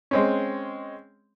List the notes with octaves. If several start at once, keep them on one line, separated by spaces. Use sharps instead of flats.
G#3 C4 C#4